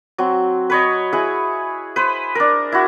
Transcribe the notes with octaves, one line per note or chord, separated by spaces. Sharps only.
F#3 C4
B4 C#5 D#5
E4 G#4 B4
B4 C5
D4 A#4
E4 F#4